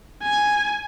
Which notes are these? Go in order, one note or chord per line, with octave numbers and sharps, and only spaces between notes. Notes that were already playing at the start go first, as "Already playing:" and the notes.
G#5